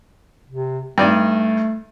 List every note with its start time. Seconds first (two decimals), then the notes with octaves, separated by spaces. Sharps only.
0.50 C3
0.98 G2 A3 D#4 D5